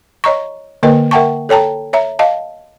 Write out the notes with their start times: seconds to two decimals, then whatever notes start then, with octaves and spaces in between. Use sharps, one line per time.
0.24 C#5 D#5 A#5 C#6
0.83 D3 A#3 A#4 B4 D#5 G5
1.11 A#4 E5 F#5 G5 A5 C#6
1.49 A4 C#5 G5 A5 A#5
1.93 C#5 E5 A#5
2.19 D#5 F5 A5